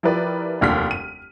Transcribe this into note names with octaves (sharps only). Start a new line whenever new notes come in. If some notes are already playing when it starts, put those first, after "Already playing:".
F3 E4 G4 A#4 B4 D5
F1 D#2 D4 F6 B6
D#7